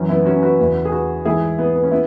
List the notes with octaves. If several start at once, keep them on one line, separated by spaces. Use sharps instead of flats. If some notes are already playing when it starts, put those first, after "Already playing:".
Already playing: F#2 E3 C#4
B3 E4
C#4 F#4
F#4 B4
E2 C#3 E3
G#4
F#4 B4
G#2 E3 E4 G#4
B3 E4
B3
C#4
B3 E4